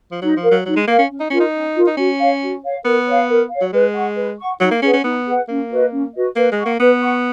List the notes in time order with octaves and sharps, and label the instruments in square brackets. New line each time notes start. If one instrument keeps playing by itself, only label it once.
[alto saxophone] F3
[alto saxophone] F#3 [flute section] D#4
[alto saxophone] F3
[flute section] A#4 F5
[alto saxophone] F#3
[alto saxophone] F#3 [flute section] D#4
[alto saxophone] G#3
[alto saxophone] A#3 [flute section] A#4 F5
[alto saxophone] C#4
[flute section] C#4
[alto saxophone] D#4
[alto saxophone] C#4 [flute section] F4 A#4
[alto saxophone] D#4
[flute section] C#4
F4 A#4
[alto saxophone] D#4
[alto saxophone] C#4 [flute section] F#4
[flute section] C#5 F5
F#4
C#5 F5
[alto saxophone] B3 [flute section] A#4
[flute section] C#5 F5
A#4
C#5 F5
[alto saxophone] F#3
[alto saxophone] G#3 [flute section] B4
[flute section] F#5 C#6
B4
F#5 C#6
[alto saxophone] F#3 [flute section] D#4
[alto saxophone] A#3
[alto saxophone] C#4 [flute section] G#4 B4 F#5
[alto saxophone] C#4
[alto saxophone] B3 [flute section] D#4
[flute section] G#4 B4 F#5
[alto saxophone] A#3 [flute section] C#4
[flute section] F#4 B4 D#5
C#4
F#4 B4 D#5
[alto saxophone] A#3 [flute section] B4
[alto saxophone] G#3
[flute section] F#5 C#6
[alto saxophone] A#3
[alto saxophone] B3 [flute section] B4
[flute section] F#5 C#6